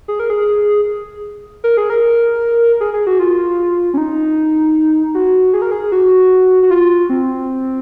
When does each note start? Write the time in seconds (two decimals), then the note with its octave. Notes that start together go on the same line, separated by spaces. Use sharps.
0.08 G#4
0.19 A#4
0.30 G#4
1.64 A#4
1.77 G#4
1.90 A#4
2.81 G#4
2.94 G#4
3.07 F#4
3.20 F4
3.94 C#4
3.98 D#4
5.15 F#4
5.53 G#4
5.62 A#4
5.71 G#4
5.92 F#4
6.63 F#4
6.70 F4
7.10 C4